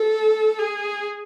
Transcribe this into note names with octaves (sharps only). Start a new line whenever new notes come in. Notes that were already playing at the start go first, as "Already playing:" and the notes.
Already playing: A4
G#4